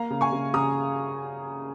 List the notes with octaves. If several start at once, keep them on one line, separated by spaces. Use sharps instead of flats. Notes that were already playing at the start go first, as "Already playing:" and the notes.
Already playing: A#3 F5 A#5
C#3
G#5 C#6
C#3
C#3 A#5 D#6